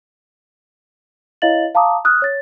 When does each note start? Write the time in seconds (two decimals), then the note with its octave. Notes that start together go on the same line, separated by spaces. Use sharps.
1.42 E4 C#5 D#5 F5 A6 F#7
1.75 F5 A5 A#5 D6 D#6
2.05 D#6 F6 F#6
2.22 C#5 A6